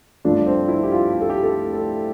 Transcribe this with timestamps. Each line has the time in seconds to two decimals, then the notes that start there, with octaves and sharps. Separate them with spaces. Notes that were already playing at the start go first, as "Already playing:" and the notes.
0.25 G2 F3 A3 D4
0.46 C4
0.68 E4
0.83 G4
0.92 F4
1.14 G4
1.21 A4
1.29 G4
1.43 A4
1.73 A4